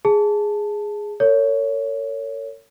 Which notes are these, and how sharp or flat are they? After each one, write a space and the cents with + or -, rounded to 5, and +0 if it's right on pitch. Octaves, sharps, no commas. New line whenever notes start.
G#4 +0 A5 +0
A#4 -45 C#5 +15